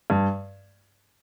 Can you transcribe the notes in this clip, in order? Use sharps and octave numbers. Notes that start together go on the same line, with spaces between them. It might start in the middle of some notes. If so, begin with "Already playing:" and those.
G2